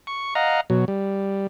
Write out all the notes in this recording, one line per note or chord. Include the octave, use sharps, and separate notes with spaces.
C#6
D#5 F5 F#5 A#5
B2 F#3
G3